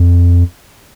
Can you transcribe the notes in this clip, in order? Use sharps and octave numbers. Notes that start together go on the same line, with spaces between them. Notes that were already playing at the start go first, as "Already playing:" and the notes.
Already playing: F2